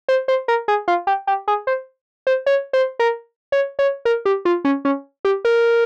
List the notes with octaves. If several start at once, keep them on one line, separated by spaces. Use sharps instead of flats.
C5
C5
A#4
G#4
F4
G4
G4
G#4
C5
C5
C#5
C5
A#4
C#5
C#5
A#4
G4
F4
C#4
C#4
G4
A#4